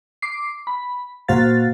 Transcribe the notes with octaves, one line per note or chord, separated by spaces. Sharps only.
D6 C7
B5
A#2 A#3 F#4 C5 F5 A6